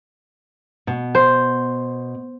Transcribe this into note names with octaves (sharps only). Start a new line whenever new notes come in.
B2
C5